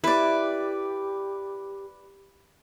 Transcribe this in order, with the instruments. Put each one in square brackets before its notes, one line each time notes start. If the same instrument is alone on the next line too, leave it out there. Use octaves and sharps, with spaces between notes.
[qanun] E4 [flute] G4 [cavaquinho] B4 D5